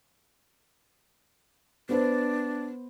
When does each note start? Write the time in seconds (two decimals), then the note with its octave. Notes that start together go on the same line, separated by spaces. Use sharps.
1.89 B3 D4 B4 C5